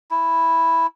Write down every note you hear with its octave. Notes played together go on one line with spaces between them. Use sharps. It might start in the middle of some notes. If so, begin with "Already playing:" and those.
E4